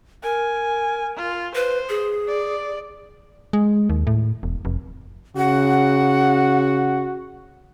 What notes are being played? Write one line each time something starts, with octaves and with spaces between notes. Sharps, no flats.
A#4 G#5
F4
B4 C5
G#4
D5
G#3
D#2
A2
E1
F1
C#3 F#4 F#5